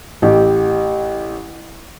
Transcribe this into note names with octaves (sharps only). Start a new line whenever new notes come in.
A1 G4